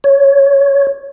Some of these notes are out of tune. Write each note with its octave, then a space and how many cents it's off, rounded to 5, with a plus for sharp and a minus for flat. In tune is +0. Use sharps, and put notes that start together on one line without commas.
C#5 +5